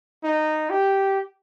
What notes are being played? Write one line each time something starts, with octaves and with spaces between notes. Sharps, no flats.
D#4
G4